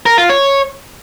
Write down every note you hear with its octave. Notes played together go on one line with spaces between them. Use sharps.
A#4
F4
C#5